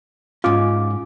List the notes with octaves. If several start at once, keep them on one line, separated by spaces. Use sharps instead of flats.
G#2 C#4 F4 D6